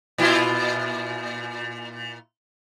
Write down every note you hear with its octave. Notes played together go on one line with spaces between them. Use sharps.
A#2 E4 F4